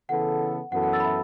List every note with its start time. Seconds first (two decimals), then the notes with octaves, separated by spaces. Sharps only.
0.09 C#3 E3 B3 A4 F#5
0.72 F#2 E3 B3 F#4 A4 F#5
0.83 F#5
0.93 E6 A6
1.00 B5
1.04 E5 A5